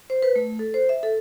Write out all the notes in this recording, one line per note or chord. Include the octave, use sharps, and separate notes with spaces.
C5
B4
A3
A4
C5
E5
A4